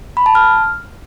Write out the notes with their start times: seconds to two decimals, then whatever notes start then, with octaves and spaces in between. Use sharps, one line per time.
0.17 B5
0.26 A5
0.35 F6